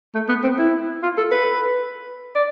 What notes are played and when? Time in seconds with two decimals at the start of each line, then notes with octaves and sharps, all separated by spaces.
0.15 A3
0.29 B3
0.44 C4
0.58 E4
1.03 F4
1.18 A4
1.32 B4
2.35 D5